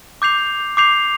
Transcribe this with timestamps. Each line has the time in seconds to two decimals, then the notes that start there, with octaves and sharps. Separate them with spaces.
0.22 D6 G6 C7 F7
0.77 D6 G6 C7 F7